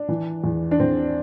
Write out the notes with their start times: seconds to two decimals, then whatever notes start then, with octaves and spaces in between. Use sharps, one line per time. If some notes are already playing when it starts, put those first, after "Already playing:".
Already playing: D4
0.09 E3
0.44 E2
0.71 D4
0.79 E2 C4